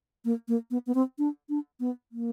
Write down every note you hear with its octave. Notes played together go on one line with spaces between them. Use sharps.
A#3
A#3
B3
B3
C4
D4
D4
B3
A#3